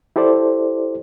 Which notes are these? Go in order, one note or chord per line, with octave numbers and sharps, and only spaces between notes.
E4 G4 A4 C5 D5